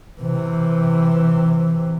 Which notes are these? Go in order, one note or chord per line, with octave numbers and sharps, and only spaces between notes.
C3 E3